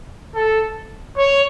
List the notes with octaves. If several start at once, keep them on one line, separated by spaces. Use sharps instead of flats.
A4
C#5